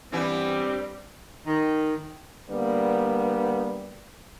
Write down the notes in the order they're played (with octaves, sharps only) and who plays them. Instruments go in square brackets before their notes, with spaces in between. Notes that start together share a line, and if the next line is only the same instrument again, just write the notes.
[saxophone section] G2 G3 C4 [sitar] E3 B3 E4
[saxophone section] D#3
[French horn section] D3 G3 A#3 B3